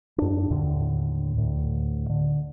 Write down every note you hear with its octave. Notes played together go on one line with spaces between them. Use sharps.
F#2 D4
D#2 A2 D3
D2 A2
D3